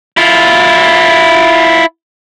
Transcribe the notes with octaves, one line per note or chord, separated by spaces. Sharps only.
E4 F4